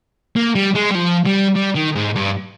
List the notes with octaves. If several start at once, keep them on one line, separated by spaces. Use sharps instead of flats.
A#3
G3
G#3
G3
F3
G3
G3
D#3
G#2
G2